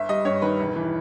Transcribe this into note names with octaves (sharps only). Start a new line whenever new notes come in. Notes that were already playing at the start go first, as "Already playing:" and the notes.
Already playing: G1 E5
G3 D#5
G2 C#5
D#3 B4
E1
E3